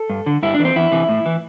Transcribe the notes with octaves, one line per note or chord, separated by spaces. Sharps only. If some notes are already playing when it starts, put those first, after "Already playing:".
Already playing: A4
G2
D3
G2 E4
D4
E3
C4
E2 E4
C3 E3
A2
E3